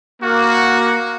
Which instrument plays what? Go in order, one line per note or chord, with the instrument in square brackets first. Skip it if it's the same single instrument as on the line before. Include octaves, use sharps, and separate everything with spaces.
[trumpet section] A#3 [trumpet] F#4